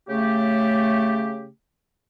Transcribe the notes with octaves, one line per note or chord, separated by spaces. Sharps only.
C#3 A3 G4